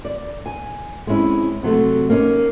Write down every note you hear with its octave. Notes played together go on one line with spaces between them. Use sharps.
D5
G#5
G#3 C4 C#4 E4
C3 F#3 A3 C4
A#3 C#4 D#4